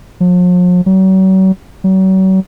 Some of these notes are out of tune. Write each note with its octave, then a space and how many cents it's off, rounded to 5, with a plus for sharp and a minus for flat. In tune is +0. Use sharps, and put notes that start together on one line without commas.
F3 +45
F#3 +40
F#3 +40